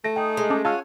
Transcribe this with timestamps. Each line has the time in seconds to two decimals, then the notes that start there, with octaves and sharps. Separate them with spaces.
0.04 A3 A#6
0.16 D#4 G#4 G5
0.37 G#3
0.50 C#4 A5 D6
0.65 F4 C#5 F#5 G#5 A5 E6 F6